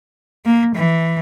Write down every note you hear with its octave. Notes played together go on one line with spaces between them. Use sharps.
A#3
E3